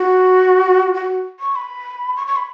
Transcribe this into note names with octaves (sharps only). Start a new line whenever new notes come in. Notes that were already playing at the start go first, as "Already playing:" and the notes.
Already playing: F#4
F#4
C#6
B5
C#6
C#6
B5